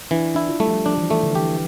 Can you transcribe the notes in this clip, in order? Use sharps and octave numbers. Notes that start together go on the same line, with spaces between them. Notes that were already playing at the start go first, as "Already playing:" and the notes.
E3 D4
D4 E4
F4
G3 A3
F3
G3
F3 D4
E3
E3 A3
D3
E3 G4